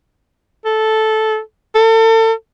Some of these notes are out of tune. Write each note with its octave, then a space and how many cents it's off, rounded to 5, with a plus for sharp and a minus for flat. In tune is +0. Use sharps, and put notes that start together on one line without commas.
A4 -10
A4 +35